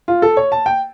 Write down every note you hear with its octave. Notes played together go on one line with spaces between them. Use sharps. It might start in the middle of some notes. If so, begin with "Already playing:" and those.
F4
A4
C#5
A5
G5